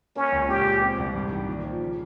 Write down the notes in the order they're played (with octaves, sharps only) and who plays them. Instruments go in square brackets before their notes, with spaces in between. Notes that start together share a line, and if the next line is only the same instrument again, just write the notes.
[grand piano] A#3 [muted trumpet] C#4
[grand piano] C#2
[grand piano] A#2 [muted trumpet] G4
[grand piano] G#3
C4
C2
G2
D#3
A#2
F3
C#3